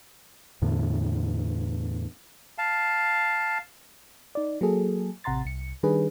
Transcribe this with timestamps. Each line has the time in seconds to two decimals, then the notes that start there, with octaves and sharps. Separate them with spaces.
0.62 E2 A2 D3
2.58 F5 A5
4.35 D#4 D5
4.61 F#3 A#3 G#4 A4
5.24 A1 C3 F#5 A#5 C6 A6
5.45 C2 C#7
5.83 D#3 G3 D4 G#4 B4